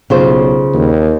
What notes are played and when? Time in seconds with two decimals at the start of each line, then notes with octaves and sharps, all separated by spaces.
0.10 B1 C#3 F4 C5
0.74 D#2